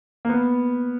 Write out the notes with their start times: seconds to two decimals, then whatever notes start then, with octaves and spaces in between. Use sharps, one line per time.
0.25 A#3
0.29 B3